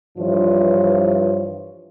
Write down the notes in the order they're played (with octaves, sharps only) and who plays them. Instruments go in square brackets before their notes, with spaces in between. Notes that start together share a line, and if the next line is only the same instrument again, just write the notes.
[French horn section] G2 E3 F3 F4 C5 C#5